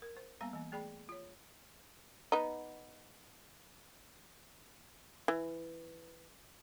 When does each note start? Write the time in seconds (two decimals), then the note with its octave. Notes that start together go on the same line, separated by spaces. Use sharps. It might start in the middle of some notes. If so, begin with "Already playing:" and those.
0.02 A#4
0.17 C5
0.41 G3 A#3 B3 F5 A#5
0.53 E3 A#3
0.72 A3 G#4 D5 G5 B5
1.09 F4 C#5
2.32 B3 D#4
5.28 E3